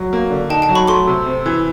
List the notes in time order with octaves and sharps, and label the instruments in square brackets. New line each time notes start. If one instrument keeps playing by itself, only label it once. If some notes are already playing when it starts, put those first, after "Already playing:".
Already playing: [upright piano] F#3
A#3
D3
[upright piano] D#4 [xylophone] G5 A5
[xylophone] G5 A5
[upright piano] F#3
[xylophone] B5 C#6
[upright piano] A3 [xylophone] C6 D6
[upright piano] C3
C4
E3